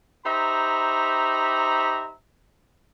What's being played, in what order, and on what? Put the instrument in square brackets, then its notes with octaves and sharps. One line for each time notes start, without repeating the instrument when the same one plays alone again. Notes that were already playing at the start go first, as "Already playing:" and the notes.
[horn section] D#4 G4 C5 E5 A#5 B5